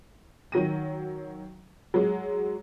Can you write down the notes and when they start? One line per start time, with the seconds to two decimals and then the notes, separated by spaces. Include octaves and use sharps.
0.52 D#3 F#3 A#6 D#7
1.94 F#3 G#3